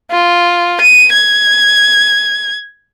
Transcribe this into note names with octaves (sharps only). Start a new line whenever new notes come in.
F4
D#7
G#6